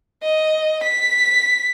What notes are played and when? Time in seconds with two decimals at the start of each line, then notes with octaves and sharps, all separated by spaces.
0.22 D#5
0.83 B6